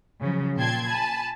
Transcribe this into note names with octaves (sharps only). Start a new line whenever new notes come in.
C#3 F3 F#3
A#2 G5 A5 C6 G#6
G#5 A5 B5